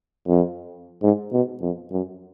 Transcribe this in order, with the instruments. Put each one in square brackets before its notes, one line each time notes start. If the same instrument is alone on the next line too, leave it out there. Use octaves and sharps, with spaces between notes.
[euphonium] F2
G#2
B2
F2
F#2